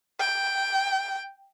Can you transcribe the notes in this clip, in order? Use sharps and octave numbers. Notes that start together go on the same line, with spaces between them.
G5